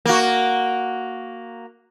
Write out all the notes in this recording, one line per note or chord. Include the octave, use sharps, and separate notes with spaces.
A#3 F#4